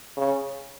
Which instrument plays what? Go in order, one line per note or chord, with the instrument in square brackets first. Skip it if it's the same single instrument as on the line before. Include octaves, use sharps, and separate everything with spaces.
[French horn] C#3